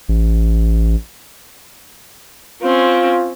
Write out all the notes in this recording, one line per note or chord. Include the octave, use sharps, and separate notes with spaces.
A1
C4 C#4 F4